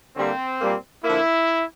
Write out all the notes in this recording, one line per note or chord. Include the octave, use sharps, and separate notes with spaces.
D3 G3 A#3 C4
A#2 G3 A#3
D3 F3 A#3 E4